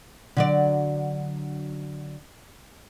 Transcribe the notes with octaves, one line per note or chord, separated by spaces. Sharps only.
D3 F#3 D5